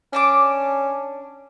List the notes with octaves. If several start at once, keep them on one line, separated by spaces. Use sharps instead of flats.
C#4 D4 A5 D6